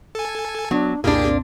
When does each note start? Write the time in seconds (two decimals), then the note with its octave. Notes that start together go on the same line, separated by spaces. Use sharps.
0.15 A4 G#5
0.71 F#3 B3 D4
1.04 C2 F2 A#2 A#3 D4 E4 G4 G#4
1.26 C4